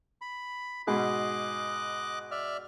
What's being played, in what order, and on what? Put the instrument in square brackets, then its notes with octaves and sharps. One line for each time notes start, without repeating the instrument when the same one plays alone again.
[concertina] B5
[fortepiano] G#2 B2 G#4 [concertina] D#5 D6 F#6
[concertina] D5 E5 F6